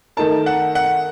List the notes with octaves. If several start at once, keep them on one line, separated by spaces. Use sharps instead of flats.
D#3 A3 D#4 A#4 A5
F#5
F#5